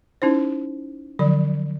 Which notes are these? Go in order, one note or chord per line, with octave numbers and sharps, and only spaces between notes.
C#4 D#4 E4 C5
D3 F3 F#3 D5